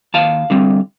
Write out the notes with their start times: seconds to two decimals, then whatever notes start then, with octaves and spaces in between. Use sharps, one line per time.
0.14 D#2 F5 A5
0.50 D3 G3 C4